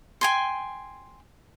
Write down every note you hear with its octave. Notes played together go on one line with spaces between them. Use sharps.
G5 G#5 C6